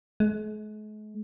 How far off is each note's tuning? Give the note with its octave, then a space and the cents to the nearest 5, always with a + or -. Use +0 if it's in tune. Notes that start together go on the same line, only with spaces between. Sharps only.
G#3 +45